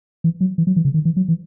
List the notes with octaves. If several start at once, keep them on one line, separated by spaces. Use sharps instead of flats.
E3
F#3
E3
F#3
E3
C#3
D#3
E3
F#3
E3